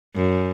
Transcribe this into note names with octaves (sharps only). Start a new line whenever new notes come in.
F#2